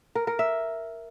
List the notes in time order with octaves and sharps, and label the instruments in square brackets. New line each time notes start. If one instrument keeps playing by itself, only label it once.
[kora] A#4
A#4
E5